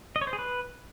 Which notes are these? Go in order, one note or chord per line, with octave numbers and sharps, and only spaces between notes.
D#5
C#5
C5
G#4
B4